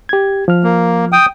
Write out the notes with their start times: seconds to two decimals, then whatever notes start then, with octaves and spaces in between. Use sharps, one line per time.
0.09 G4 G#6
0.48 F3 F6
0.63 A#3
1.12 G5 D#6